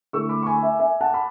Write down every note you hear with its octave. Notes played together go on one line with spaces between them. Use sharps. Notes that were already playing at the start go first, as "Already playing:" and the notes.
D3 A3 E4 C#6 E6
B5 D6
C#6
G#5 B5
E5 G#5
E5 G#5
F#5 A5
B5